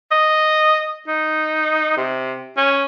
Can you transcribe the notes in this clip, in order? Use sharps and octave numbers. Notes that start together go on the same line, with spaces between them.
D#5
D#4
C3
C#4